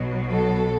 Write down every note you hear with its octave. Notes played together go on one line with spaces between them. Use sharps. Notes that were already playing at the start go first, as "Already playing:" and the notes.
Already playing: B1 B2 F#3
A4